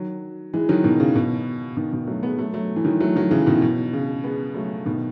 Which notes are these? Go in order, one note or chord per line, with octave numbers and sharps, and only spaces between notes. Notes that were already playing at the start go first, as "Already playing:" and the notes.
Already playing: D#3 F#3
E3 G#3
D#3 F#3
B2 D#3
C#3
B2
B2 D#3
B2 D#3
F#3 A3
G#3 B3
F#3 A3
F#3 A3
E3
D#3 F#3
F#3 A3
D#3 F#3
C#3 E3
B2 D#3
B2
C#3
G#3 B3
F#3 A3
B2 D#3